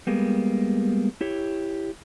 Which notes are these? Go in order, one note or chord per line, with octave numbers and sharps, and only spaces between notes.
G3 G#3 A#3 B3
E4 G4 C#5